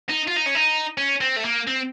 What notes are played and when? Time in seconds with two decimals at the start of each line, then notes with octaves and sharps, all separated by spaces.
0.10 D#4
0.28 F4
0.37 D#4
0.46 C#4
0.55 D#4
0.97 C#4
1.21 C4
1.36 A3
1.44 A#3
1.67 C4